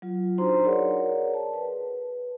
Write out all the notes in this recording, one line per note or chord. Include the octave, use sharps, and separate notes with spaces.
F#3 F4
D4 D#4 F#4 C5 A#5 C6
G#4 A#4 C#5 D5 F#5
A5
B4